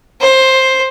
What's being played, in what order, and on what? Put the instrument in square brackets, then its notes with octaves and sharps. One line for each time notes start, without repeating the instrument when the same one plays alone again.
[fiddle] C5